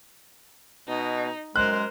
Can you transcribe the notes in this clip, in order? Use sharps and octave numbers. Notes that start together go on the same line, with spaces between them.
B2 D#4
F#2 G#3 A#4 C5 F#6